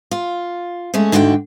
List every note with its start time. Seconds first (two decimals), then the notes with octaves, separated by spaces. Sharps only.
0.11 F4
0.94 G#3 A3 C#4
1.12 D#2 G#2 D3 F#4 F#5 G5